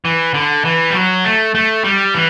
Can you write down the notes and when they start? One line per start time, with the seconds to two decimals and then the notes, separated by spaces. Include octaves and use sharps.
0.05 E3
0.34 D3
0.65 E3
0.90 G3
0.95 F#3
1.25 A3
1.55 A3
1.84 G3
2.15 E3